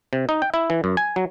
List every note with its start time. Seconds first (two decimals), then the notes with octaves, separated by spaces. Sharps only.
0.13 C3
0.29 D#4
0.42 G5
0.54 E4
0.70 E3
0.84 F#2
0.97 G#5
1.16 F#3